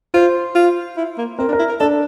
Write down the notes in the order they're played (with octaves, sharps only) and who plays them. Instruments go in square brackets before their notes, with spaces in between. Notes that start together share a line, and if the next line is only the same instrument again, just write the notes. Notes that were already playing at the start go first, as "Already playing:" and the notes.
[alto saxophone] F4 [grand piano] C5
[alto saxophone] F4
E4
A#3
[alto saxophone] C4 [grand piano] A#4
[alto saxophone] D4
[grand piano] A#4
[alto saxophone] E4
A#4
[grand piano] D4 [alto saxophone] A4